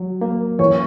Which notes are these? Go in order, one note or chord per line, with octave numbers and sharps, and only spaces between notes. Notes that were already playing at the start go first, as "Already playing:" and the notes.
Already playing: F#3
A#3
E3 C#5